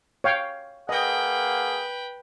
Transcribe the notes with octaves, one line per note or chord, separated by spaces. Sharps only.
C#5 F5 G5
A#3 G#4 B4 D#5 F#5 G5